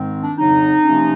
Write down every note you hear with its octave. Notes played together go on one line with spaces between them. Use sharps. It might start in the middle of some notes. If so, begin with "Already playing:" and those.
Already playing: G#2 D#3 G#3 C4
D4
F2 C#3 F#3 D#4
C3 F3 A#3 C#4